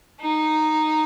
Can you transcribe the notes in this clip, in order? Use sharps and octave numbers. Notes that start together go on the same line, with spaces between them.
D#4